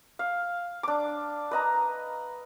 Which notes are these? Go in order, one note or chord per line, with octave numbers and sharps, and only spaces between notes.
F5
D4 D6
B4 D#5 A#5